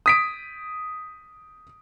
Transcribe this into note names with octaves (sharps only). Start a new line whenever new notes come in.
D#6 B6 D7